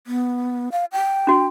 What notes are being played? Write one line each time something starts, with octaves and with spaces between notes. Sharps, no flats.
B3
F5
G5
D4 F#4